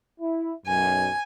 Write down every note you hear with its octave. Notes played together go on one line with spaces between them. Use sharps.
E4
B1 F#2 G#5